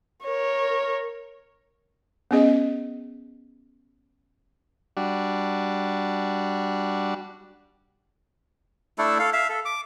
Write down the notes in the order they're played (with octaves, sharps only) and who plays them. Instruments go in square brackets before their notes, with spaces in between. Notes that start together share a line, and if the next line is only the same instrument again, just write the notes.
[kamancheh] A#4 C#5
[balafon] B3 C#4 G#4 D#5
[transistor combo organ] G3 D4 F#4
[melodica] A3 D4 E4 A4
A4 F5
E5 F5
A4
D6